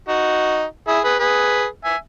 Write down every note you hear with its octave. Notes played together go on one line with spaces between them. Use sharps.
D#4 F#4
E4 G#4
G#4 B4
G#4 B4
E5 G#5